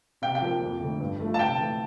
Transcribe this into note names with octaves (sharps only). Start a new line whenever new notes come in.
C3 G5
G5
F3 A#3
F2
D3 A3
G2
F3 A3
A5
C3 G5
E3 A3